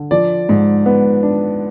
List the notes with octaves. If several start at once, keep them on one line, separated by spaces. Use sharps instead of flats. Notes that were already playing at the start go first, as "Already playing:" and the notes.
Already playing: D3
F3 D5
G#2
B3
D4